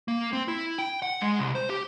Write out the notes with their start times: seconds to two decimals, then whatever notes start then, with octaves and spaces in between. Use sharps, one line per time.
0.08 A#3
0.33 C4
0.48 E4
0.78 G5
1.02 F#5
1.22 G#3
1.39 C2
1.55 C5
1.70 G4